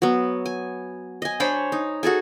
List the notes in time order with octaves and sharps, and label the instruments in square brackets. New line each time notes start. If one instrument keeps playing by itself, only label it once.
[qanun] F#3 B3
G#5
D#5 G#5
D4 C5 C#5 B5
D#4
F#4 G#4 A4 G#5